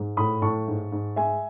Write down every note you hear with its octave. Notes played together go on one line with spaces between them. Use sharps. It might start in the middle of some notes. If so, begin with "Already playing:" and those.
Already playing: G#2
A2 B5 D#6
A2 A5 C#6
G#2
G#2
G#3 E5 G#5